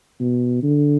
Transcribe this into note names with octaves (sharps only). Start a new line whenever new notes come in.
B2
D3